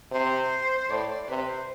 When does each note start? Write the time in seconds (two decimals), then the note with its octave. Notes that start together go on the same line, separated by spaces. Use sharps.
0.11 C3 C5
0.89 A2 D5
1.10 D5
1.29 C3 B4
1.49 C5